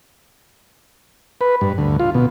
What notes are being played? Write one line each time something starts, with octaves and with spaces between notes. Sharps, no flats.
B4
G2
D2
F4
B2